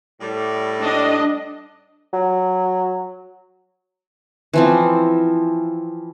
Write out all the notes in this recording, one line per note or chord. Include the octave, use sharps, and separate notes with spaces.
A2 G3
D4 D#5
F#3
E3 F3 C4